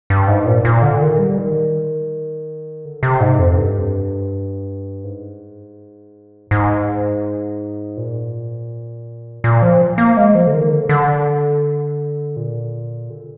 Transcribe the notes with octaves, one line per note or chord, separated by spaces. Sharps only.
G2
G#2
A#2
A#2
D3
D#3
G3
D#3
D3
C3
G#2
F2
G2
G#2
G#2
A#2
A#2
F3
A#3
G#3
F3
D3
D#3
D3
D3
A#2
D3